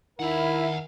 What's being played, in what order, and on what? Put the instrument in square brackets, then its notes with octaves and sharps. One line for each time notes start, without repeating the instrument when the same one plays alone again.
[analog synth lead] D#3 [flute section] E4 [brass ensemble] A#4 [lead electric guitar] E5 F#5